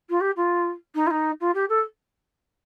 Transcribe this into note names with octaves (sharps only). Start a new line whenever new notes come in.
F4
G4
F4
D#4
F4
D#4
F4
G4
A4